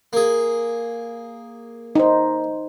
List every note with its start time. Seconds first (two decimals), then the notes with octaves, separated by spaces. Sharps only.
0.13 A#3 G#4
1.95 D#4 C5